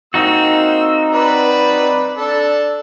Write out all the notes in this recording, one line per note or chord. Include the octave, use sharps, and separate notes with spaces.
A#3 C4 D#4 F#4 E6
B4 D5 B5
D4 A4